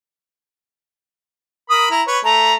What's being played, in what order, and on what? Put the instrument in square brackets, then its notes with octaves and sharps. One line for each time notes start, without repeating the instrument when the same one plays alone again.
[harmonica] A#4 B5 D#6
E4 A#5
B4 C#5
[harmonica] A3 [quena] A#5